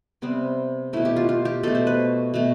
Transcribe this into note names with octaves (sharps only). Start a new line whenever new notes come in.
C3 G3 B3 C4
B2 A3 E4
G4
F4
F4
G4
B2 A3 A4
C5
B4
B2 A3